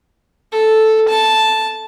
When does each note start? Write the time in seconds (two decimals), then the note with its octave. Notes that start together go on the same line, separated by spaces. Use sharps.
0.52 A4
1.08 A5